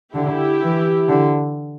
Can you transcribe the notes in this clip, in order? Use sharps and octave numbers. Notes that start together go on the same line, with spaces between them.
D3 E4 G4
E3
D3